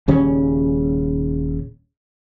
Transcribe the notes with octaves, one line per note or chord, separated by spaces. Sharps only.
D#1 C#3 G3 C#4